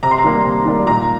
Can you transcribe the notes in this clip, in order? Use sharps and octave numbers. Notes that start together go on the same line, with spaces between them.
C3 A#5
C6
A#5
D#3 G3 A#3
C3
D#3 G3 A#3
A#2 A#5